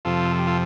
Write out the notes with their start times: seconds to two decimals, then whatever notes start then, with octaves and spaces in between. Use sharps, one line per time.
0.05 F2 C3 F3 F4 A4
0.31 A4
0.39 G4
0.47 F4 A4